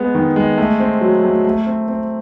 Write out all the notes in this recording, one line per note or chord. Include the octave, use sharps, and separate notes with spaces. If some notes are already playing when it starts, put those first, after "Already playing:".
Already playing: G#3 B3
D#3
G#3
A3
C4
F#3
A3
A3
C4
C4